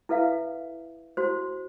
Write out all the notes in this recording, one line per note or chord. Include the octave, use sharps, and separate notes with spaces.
E4 A4 B4 E5 F5
E4 F#4 C5